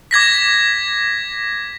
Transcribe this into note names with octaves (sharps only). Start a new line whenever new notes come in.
D6 G#6 A#6 B6